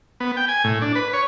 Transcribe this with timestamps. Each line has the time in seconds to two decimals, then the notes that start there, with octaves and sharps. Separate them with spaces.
0.20 B3
0.37 G5
0.48 G#5
0.64 A2
0.81 D4
0.95 B4
1.13 C#5